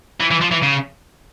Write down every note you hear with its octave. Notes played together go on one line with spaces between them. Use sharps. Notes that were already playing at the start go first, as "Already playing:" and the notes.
E3
E3
F3
E3
C#3